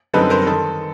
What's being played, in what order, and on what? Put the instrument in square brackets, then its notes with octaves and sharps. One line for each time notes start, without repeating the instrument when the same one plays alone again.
[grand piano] F#2 D3 G3 C4 D#4 A4 B4
A#4 C5
D#3 A4